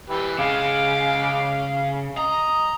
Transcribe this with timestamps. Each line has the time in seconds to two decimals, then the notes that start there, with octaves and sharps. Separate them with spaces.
0.10 E3 G4 B4
0.39 C#3 G#3 F5 D6
2.17 D#5 A#5